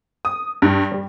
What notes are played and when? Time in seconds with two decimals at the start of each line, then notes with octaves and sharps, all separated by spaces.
0.25 D#6
0.62 G2
0.92 G3